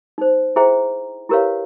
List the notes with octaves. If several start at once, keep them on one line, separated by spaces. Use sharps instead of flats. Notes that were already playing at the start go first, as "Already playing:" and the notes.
D#4 C5
E4 G#4 C5 E5 G5 A#5
E4 G4 A#4 B4 C#5 F5